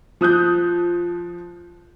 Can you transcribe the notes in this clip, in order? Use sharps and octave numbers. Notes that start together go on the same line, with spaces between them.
F3 D#6 F#6 G6